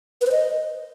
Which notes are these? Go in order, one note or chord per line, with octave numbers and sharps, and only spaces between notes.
B4
C5
D#5